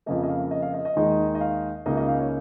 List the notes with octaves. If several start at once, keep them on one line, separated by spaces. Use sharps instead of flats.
F2 C#3 A#3 D#5
D#5
F5
D#5
F5
D#5
D#5
D#2 D#3 G#3 D#4
D#5
F5
C#2 C#3 A#3 D#4 D#5
D#5
F5
C#5